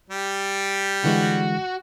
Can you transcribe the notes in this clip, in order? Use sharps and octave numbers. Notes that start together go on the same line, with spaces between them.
G3 G4
D3 E3 G#3 F#4